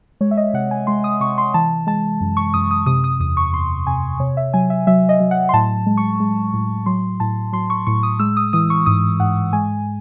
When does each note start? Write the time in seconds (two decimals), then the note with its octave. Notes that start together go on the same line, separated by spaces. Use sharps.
0.21 G#3 C#5
0.31 E5
0.37 D#5
0.53 C3 F#5
0.71 G#5
0.87 G#3 C6
1.04 D#6
1.20 C3 C#6
1.38 C6
1.54 E3 A5
1.87 G#3 A5
2.21 F#2
2.37 C#6
2.54 F#2 D#6
2.71 D#6
2.86 C3 D#6
3.04 D#6
3.20 E2 D#6
3.37 C#6
3.53 E2 C6
3.87 C3 G#5
4.20 C3 C#5
4.37 E5
4.54 F#3 G#5
4.70 E5
4.87 F#3 E5
5.09 D#5
5.20 F#3
5.31 F#5
5.49 C6
5.54 A2 A5
5.86 G#3
5.97 C#6
6.20 G#3
6.54 A2
6.86 F#3 C6
7.20 A2 A5
7.53 F#3 C6
7.70 C#6
7.87 A2 C#6
8.03 D#6
8.20 G#3 E6
8.37 D#6
8.53 E3 D#6
8.70 C#6
8.86 G#2 D#6
9.20 G#2 F#5
9.53 G#3 G#5